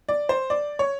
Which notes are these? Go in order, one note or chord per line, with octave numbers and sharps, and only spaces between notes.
D5
C5
D5
C#5